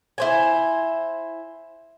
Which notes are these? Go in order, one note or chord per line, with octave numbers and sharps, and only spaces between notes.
E4 C5 G#5